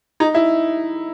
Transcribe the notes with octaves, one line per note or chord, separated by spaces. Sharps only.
D#4
E4